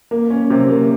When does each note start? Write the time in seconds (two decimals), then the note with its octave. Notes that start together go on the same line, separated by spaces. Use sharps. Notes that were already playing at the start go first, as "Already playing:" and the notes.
0.11 A#3
0.30 C#4
0.50 C3
0.70 A#3